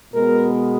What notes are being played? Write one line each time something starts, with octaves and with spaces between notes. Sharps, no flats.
B2 G#3 B3 A#4